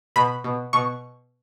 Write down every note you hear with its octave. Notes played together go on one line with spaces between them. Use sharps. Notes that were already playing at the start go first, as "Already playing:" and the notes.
B2 B5
B2
B2 C#6